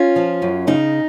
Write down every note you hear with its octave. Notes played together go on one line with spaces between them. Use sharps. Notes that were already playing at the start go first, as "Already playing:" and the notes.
Already playing: C#4 F4
F3
F#2
C#3 D#4